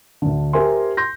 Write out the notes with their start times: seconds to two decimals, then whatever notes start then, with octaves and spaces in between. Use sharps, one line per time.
0.22 D2 D3
0.53 G4 A#4 C5 E5 G#5 C6
0.97 C6 G6 A#6